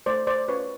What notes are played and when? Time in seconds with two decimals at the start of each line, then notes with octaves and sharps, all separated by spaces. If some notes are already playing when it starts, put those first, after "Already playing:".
0.06 A3 C5 D5
0.27 C5 D5
0.48 C#4 F4 B4 C#5